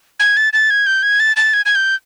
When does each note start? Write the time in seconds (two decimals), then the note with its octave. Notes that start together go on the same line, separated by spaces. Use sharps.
0.20 G#6
0.37 A6
0.53 A6
0.70 G#6
0.86 G6
1.03 G#6
1.20 A6
1.36 A6
1.53 G#6
1.66 G#6
1.75 G6